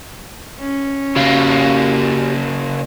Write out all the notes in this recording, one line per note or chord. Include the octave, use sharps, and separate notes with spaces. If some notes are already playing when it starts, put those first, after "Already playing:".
C#4
C#3 A#3 F#4 G4 F5